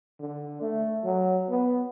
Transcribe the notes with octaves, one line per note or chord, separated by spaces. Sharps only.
D3
A3
F#3
B3